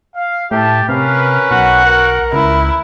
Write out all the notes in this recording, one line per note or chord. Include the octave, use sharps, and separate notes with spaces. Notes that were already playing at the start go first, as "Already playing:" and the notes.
F5
A2 G4 E5 A5
C3 C#4 A#4 B4 F5
B1 F#4 F#5
A#4
C#2 E4 B4